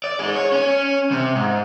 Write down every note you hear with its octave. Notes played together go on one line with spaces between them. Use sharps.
D5
D#4 G#4
C#5
C#4 C#5
C3
G#2